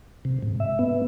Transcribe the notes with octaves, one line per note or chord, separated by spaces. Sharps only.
C3
G#2
E5
B3